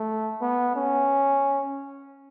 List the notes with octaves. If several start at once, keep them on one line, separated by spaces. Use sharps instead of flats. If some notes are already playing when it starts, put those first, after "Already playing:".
Already playing: A3
B3
C#4